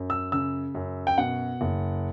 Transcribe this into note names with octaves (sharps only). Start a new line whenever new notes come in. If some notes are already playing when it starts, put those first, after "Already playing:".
Already playing: F#2
E6
C#3 E6
F#2
G5
B2 F#5
F#1